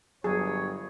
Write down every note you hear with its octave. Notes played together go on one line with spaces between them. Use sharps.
G1 F#3 G#4 C#5